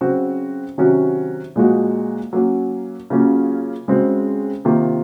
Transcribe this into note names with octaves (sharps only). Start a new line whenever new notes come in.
C#3 F#3 C4 F#4
C3 D#3 F#3 C#4 F#4
A#2 F3 G#3 D#4 F#4
F#3 A#3 C#4
C#3 F#3 A#3 C#4 F4
C#3 G#3 C4 F#4
C3 D#3 A#3 F4